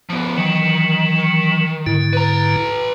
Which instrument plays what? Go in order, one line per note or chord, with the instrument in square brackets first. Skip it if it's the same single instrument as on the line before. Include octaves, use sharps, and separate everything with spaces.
[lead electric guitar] F3 B3
[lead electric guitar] D#3 [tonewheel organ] E3 F#3
[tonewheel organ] G#2 D3 E4
[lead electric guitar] B4 A#5